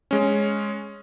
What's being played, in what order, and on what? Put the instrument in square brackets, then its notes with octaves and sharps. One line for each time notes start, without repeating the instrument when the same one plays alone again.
[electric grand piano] G#3 C#4